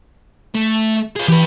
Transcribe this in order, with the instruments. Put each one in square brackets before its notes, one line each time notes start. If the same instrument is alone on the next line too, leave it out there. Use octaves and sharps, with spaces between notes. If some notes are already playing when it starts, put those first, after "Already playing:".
[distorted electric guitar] A3
F4 G#4
[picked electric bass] E3 [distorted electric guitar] G4 B4